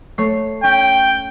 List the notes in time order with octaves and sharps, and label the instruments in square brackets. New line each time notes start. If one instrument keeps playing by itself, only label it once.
[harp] A3 C#5 C7
[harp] C#4 [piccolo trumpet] G5